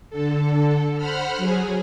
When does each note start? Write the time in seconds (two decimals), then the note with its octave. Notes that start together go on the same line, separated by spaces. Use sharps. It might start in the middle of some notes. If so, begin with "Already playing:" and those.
0.10 D3 A4
0.97 C5 F#5 B5 F6
1.37 F#3 G#4